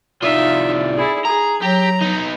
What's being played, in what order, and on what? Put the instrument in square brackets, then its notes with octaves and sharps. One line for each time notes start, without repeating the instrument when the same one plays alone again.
[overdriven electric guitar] C2 F4 [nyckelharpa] D#4 E5 [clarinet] D5
[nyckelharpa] E4 G#4
[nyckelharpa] G#4 [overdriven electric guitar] A#5
[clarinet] F#3 [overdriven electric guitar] G4 [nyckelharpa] A#5
[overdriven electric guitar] B3 D#4